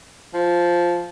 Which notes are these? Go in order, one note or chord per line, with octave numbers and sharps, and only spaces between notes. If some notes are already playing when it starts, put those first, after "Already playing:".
F3